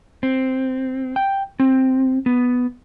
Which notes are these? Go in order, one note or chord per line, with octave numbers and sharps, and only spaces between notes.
C4
G5
C4
B3